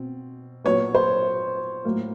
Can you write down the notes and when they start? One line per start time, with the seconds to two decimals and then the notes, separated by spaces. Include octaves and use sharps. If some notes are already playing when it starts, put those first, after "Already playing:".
Already playing: B2 C4
0.64 A#2 F#3 B3 C#5
0.95 C5
1.85 A2 F#3 A#3